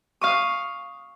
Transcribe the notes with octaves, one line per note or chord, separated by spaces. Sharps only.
F5 C#6 D#6